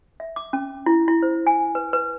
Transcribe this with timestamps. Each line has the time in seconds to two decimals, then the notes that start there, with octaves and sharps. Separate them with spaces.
0.20 E5
0.36 D6
0.53 C#4
0.86 E4
1.08 E4
1.23 C5
1.47 G#5
1.75 B4
1.93 B4